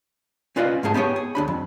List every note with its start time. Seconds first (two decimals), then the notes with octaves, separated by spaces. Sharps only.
0.56 C#4 F4 B4 D5 D#5 F5
0.83 G#2 A3 C#4 G#4 A5
0.94 B3 G4 G#4 C5 C#5
1.16 G#4
1.35 D2 D4 B5
1.48 F2